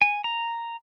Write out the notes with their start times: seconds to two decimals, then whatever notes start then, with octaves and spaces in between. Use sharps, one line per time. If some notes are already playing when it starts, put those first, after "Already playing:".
0.02 G#5
0.24 A#5